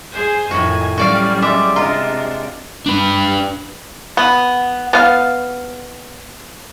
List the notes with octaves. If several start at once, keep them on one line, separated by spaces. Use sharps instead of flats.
G#4 C5 G#5
F2 A2 D#3 F#4 G#5
F#3 G3 C#4 F#4 D5 F5
G#3 D5 E5
C3 D4 F4 C5 D#5 A#5
D4 B4
B3
B3 F5